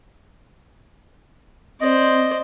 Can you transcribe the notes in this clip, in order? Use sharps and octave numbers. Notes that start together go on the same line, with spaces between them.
C4 C5 D5 D#5